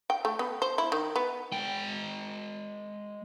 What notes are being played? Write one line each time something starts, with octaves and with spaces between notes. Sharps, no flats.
G5
A3
B3
C5
E4
D#3
B3
G#3 G5